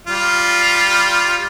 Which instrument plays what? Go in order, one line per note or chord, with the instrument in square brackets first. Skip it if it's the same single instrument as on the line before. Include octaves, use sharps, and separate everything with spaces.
[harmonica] G3 F4